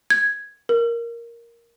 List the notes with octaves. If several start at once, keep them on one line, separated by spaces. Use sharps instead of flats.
G#6
A#4